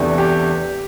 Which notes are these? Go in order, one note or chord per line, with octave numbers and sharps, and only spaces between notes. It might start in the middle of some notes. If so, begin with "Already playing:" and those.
Already playing: E2 C3 E3 A3 D4
G4